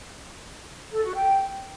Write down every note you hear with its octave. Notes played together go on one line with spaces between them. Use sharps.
A4
F#4
G5